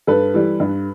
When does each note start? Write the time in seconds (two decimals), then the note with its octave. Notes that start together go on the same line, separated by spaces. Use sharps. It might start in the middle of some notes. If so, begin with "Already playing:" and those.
0.07 G2 A4 B4
0.34 E3 G3
0.60 G2